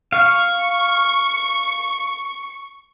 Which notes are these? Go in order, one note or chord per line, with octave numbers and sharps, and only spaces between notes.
F5 C#6